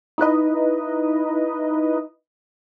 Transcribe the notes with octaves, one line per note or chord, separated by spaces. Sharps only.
D#4 E4 B4 D#5